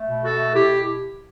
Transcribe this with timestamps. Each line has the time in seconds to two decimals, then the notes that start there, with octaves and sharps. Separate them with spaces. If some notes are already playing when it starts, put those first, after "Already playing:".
Already playing: A3
0.09 B2
0.24 F#4 A4
0.32 A3
0.54 B2 E4 G4